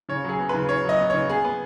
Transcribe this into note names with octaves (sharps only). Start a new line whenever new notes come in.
C#3 C#5
F#3 G#4
B3
C#3 B4
C#3 C#5
F#3 D#5
B3
C#3 C#5
B3 G#4
B3